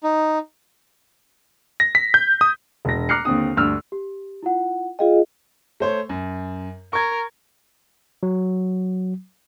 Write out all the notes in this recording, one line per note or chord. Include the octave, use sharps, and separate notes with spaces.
D#4
A#6
B6
G6
D#6
E1 A#6
A#5 D6 F6 F#6 C7 C#7
D#2 D3 C4 D#6
D2 G2 E6 F6
G4
E4 F4 F#5
F4 G#4 D#5 F5 G5
A3 C5 C#5
F#2
A#4 C#6 G#6
F#3